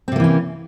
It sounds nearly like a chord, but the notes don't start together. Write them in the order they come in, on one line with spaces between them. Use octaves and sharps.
C4 C3 A#3 E3 C#4